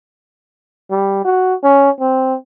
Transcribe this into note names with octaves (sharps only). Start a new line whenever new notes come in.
G3
F#4
C#4
C4